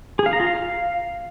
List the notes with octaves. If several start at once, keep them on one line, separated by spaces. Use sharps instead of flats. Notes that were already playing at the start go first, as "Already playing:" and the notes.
G#4
F5
A#5
F4
F5